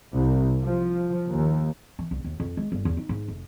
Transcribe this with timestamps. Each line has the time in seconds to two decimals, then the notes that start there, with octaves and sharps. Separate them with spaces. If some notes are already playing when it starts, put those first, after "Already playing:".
0.13 C2
0.63 F3
1.29 D#2
1.99 E3
2.11 C2
2.24 D#2
2.40 F2
2.57 G#3
2.72 G1
2.85 E2
2.97 D#4
3.09 G#2
3.28 F1